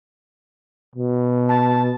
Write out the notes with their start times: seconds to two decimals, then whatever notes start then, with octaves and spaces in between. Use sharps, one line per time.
0.96 B2
1.49 A5